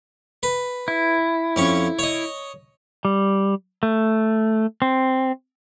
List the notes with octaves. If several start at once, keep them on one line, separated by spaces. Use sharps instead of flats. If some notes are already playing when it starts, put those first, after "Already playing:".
B4
E4
F2 C#4 C#6
C#5 D#5
G3
A3
C4